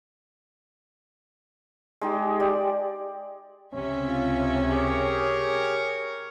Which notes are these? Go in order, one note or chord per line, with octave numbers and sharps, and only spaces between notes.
G#3 D#4 G4
G4 D5
C#2 C3 C#4 E5
F4
G4 G#4 A#4 C#5